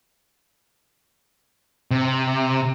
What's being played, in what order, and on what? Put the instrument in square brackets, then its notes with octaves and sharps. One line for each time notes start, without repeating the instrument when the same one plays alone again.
[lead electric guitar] C3